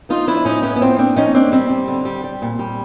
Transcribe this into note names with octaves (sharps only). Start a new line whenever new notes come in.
F3 D#4 F4
F3 D4 E4
A2 C#4 D#4
A2 B3 C#4
B3
F3 C4
A#3 C4 D4
F3 C#4 D#4
A#3 C4 D4
G3 C4
G3
D3
G3
G3
A#2
G3